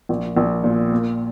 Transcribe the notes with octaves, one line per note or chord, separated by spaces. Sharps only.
A#1
A#1
A#2
A#3